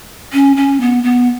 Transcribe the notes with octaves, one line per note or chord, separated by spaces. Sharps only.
C#4
C#4
B3
B3